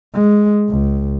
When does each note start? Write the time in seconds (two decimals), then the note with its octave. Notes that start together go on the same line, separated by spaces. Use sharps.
0.15 G#3
0.69 C#2